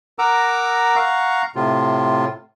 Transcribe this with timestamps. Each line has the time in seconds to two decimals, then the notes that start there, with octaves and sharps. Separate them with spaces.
0.19 A#4 F#5 A#5 D6 E6
0.96 F5 F#5 A#5 C#6
1.56 A2 C3 F4